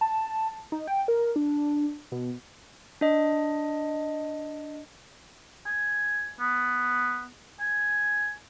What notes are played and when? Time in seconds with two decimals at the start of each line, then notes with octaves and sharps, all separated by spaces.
0.01 A5
0.72 D#4
0.87 G5
1.08 A#4
1.36 D4
2.12 B2
3.01 D4 D#5
5.66 G#5
6.40 B3
7.60 G#5